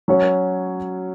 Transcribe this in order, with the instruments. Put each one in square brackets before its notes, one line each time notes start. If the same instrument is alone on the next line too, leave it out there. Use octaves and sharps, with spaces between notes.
[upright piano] F#3 C#4 F#4 C#5